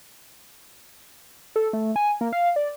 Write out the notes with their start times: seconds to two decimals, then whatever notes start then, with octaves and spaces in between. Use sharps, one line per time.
1.56 A4
1.73 A3
1.96 G#5
2.21 A#3
2.33 F5
2.56 D5